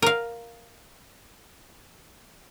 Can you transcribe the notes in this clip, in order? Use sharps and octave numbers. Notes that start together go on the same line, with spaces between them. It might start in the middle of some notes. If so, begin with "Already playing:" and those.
A#4 F5